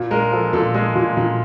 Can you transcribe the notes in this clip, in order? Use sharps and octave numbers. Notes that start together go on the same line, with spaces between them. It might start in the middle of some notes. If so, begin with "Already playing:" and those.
Already playing: A#2
G#3 A#4
F3 A4
A#2 A4
G#3 G#4
A#2
A#2